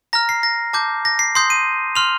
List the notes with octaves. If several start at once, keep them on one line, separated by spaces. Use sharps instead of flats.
A#5 F6 A#6
C7
A#6
A5 D6 G6
A#6
C7
C6 D#6 G6 C7
D#7
C6 F6 F7